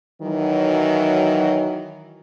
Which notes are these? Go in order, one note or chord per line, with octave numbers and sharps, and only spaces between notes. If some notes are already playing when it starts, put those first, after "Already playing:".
D#3 E3 F#3